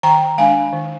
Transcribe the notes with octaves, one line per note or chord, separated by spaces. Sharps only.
D#3 G5 A#5
G#3 D4 F5 G#5
D#3